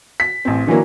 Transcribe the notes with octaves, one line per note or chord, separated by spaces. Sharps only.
B6
A1 C4
D3 E3 F#3 A#3